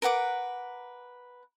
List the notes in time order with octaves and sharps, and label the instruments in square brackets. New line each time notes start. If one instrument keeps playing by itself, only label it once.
[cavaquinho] A#4 B4 F#5 D6